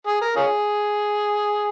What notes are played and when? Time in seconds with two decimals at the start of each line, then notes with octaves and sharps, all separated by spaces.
0.07 G#4
0.21 A#4
0.36 C#4 F4 G#4